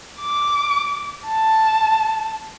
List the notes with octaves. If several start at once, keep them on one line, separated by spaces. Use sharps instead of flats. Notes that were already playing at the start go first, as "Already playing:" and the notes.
D6
A5